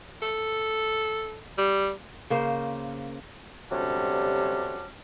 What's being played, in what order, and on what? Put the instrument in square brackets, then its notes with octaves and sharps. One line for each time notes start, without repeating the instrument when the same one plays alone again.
[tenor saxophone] A4
G3
[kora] C#3 A#3 C5
[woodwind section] D2 C3 F#3 G3 C#4 D4